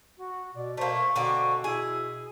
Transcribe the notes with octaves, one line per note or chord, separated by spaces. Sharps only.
F#4
B2 D5
A3 A#3 C5
C#6
B2 D3 A#3 C4
E4 G#4